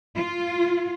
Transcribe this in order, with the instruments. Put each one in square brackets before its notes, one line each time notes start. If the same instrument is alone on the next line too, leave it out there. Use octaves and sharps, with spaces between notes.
[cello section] F4